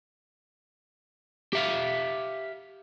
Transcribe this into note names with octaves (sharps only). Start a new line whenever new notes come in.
G4 E5 F5